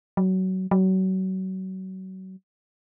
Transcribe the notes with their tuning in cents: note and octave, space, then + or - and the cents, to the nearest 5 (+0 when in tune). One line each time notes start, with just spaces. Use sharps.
F#3 +20
F#3 +30